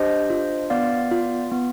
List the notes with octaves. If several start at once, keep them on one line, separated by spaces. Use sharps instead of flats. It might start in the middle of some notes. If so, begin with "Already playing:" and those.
Already playing: D4 G4 C5 D#5
F4
B3 D5 F5
F4
B3